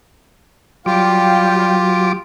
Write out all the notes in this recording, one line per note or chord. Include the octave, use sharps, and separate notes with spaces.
F#3 G3 F4 G4 F5 G5 D6